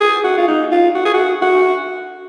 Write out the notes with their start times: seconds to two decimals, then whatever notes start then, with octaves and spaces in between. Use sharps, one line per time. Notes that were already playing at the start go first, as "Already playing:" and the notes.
0.01 G#4
0.24 F#4
0.38 F4
0.48 D#4
0.72 F4
0.95 F#4
1.05 G#4
1.14 F#4
1.42 F#4